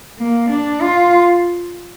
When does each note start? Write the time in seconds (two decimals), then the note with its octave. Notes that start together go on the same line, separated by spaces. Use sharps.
0.19 A#3
0.50 D4
0.82 F4